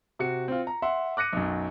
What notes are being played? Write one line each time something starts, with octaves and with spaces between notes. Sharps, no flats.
C3 F#4 C#7
C4 F4
A#5
E5 F#5 C6
D6 F#6 A#6 C#7 D#7
B1 F#2